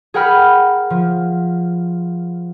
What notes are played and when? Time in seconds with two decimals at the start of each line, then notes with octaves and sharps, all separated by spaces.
0.14 G#4 A#4 F#5 G5 B5 F6
0.90 F3